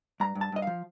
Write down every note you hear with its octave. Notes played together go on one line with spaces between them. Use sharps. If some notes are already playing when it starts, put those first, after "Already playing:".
G2 A#5
G2
A5
G2 D#5
F3 F5